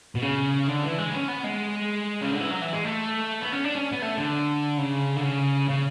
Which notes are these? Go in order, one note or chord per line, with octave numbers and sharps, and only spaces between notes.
B2
C#3
D3
E3
G#3
B3
C#4
B3
G#3
C#3
D3
E3
F#3
E3
G#3
A3
B3
C#4
D4
C#4
B3
A3
D3
C#3
D3
C#3
C#3